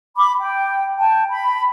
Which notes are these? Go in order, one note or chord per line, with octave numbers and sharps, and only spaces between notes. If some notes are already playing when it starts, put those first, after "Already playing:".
B5 D6
G5
G5 A5
B5